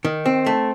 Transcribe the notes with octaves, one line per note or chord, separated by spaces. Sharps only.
D#3
C4
A3